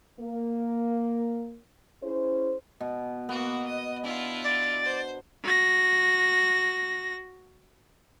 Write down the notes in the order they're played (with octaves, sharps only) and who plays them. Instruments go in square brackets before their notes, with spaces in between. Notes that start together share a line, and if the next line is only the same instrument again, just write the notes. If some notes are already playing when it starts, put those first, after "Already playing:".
[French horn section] A#3
C#4 E4 G#4 C5
[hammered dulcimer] B2
[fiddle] A#3 F#4 [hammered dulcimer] B3
[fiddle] D#5
[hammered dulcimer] D4 [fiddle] E4 F4
[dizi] D5
[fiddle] C5
[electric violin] F#4 A#6